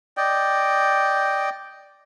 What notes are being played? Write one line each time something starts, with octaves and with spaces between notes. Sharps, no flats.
D5 D#5 G5